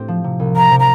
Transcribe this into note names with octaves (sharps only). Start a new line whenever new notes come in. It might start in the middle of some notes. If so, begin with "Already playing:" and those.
Already playing: A2 C4 G4
F3
C3
C2
F3 A#5
C3
A#5